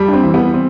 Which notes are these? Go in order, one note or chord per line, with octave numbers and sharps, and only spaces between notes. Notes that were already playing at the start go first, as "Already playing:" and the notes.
Already playing: F2 G3
D4
C4
E3
B3
C4